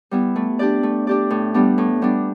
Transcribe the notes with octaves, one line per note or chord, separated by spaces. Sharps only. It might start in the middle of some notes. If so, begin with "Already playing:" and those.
G3 B3 E4
A3
D4 G4 D5
A3
D4 G4 D5
A2
G3 B3 D4
A2
G3 B3 D4